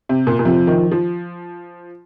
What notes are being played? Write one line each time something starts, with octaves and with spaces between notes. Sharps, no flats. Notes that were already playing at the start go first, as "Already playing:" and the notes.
C3
A#2
A#2
C3 F3
D#3
F3